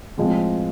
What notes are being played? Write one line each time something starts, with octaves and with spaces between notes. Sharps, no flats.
A2 F3 G#3 C4